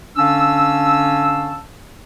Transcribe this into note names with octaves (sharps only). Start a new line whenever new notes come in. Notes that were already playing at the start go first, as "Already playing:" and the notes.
D3 C#4 D4 F5 A5 E6